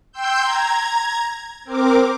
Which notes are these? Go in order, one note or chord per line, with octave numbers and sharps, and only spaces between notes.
G5 C6 E6 G6
A#5 G#6
C4 A#4 D6